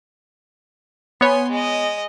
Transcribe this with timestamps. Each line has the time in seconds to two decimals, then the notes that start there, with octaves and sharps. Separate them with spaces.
1.21 B3 C#5 G#5 C6
1.50 G#3 D#5